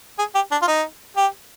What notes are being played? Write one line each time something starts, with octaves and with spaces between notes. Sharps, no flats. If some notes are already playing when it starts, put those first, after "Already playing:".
G#4
G4
D4
F4
D#4
G4